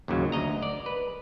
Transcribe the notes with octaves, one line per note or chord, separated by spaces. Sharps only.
D#2 A#2 C#3 F#3
D2 D#5 A#5
D5
B4